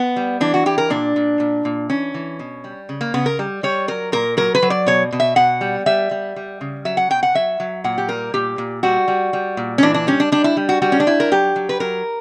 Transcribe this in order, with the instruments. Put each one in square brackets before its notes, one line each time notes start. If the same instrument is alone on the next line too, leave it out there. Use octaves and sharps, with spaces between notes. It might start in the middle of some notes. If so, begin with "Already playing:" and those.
Already playing: [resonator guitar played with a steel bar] B3
G3
E3 D4
F#4
E3 G4
A#4
A#2 D4
A#2
A#2
A#2
E3 C#4
E3
B2
G3
C#3
A#3
C#3 B3
A#4
G3
G3 C#5
F#3 A#4
A#2 A#4
F#3 A#4
B4
F#3
D5
B2 C#5
B2
E5
B2 F#5
G3
G3 E5
G3
G3
C#3
F#3 E5
F#5
B2 G5
F#5
F#3 E5
F#3
A#2 F#5
G4
G3 A#4
A#2 G4
A#2
G3 F#4
G3
G3
A#2
C#4
E3 D4
D4
G3 C#4
D4
G3 D4
E4
G3
F#4
G3 F#4
C#4
D4
G3 E4
A#4
F#3 G4
F#3
B4
F#3 A#4